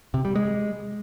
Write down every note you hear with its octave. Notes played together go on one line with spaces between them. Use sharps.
C3
G3
G#3